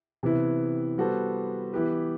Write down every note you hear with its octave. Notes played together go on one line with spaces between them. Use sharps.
C3 E3 B3 E4
G3 B3 F#4 A4 C5
E3 B3 E4 G4 B4